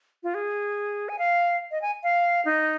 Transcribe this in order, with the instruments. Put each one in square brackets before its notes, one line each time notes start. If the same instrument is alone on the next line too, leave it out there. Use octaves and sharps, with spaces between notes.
[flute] F4
G#4
G#5
F5
D#5
G#5
F5
D#4